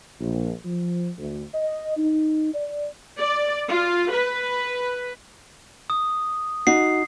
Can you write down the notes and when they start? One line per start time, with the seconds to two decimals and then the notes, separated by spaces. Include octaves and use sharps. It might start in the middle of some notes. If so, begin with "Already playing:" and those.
0.20 A#1
0.65 F3
1.18 D2
1.54 D#5
1.97 D#4
2.54 D5
3.18 D5
3.69 F4
4.12 B4
5.90 D#6
6.67 D#4 F#4 C7